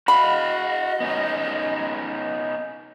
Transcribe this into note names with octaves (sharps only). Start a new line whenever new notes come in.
F#4 D#5 F5 F#5 B5
B3 C#4 D#4